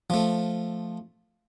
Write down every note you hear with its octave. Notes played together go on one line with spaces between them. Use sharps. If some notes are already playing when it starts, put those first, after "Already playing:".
F3 A3